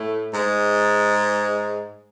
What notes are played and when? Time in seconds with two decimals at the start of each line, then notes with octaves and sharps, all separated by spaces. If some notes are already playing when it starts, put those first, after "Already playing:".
Already playing: A2 A3
0.33 G#2 G#3